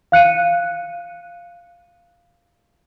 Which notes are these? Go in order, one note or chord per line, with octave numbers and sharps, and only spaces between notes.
F5 F#6 C#7 D#7